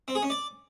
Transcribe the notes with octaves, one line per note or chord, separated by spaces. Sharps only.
C4
G#4
C#4
D5